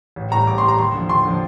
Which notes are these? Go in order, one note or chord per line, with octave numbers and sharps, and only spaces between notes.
A1
A2 G3 A#5
A1 D6
A2 G3 C6
A#5
D#2 C6
D3 F3
D#2 C6
D3 F3